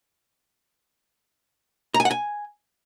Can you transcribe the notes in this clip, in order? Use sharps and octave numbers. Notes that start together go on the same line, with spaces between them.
A#5
G#5
F#5
G#5